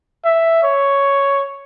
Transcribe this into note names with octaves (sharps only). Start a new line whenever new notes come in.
E5
C#5